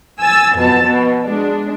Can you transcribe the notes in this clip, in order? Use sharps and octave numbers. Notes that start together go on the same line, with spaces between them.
G#5 E6 A6
F2 B2 A5
B2
G#3 D4